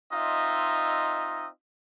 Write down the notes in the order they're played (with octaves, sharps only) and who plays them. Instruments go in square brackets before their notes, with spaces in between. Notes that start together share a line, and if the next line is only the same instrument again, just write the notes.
[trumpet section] C4 D#4 F4 D#5 E5